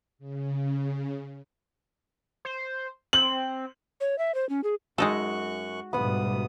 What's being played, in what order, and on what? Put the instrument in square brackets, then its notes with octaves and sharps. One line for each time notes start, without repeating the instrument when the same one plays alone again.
[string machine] C#3
[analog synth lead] C5
[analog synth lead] C4 [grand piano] F#7
[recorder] C#5
E5
C5
C#4
G#4
[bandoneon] F#2 C#6 F#6 [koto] G#3 D#4 A4 [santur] F#4
[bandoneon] D2 D#6 [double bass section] G#2 B2 G3 [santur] B3 F#5